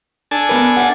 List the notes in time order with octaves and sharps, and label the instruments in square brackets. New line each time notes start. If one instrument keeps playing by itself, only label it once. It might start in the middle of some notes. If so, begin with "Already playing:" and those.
[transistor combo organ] D4 A4 G#5
[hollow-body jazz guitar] B3 A#4 B4
E5 F#5